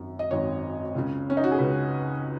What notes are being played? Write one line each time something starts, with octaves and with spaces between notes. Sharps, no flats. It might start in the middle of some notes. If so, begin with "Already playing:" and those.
Already playing: G#1 F#2 D#3
D#5
G#1 F#2 D#3 C#5
C#2 C#3
C#4
D#4
F#4
G#4
C#2 C#3 B4